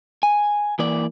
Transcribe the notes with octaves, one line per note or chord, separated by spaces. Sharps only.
G#5
E3 A#3 D5